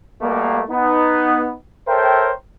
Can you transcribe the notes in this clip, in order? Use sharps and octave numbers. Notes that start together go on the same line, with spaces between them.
B2 G3 A3 A#3
B3 D#4
A4 A#4 C5 C#5 E5 G5